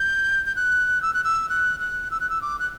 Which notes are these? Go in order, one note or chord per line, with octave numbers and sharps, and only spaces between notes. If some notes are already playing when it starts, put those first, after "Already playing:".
Already playing: G6
G6
F#6
E6
F#6
E6
F#6
F#6
E6
F#6
E6
D6
F#6